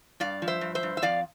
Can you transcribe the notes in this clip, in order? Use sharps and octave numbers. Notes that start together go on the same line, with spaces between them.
G2 D5 F5
F3
C5 E5
G2
C5 E5
G2
E5
F2 D5 F5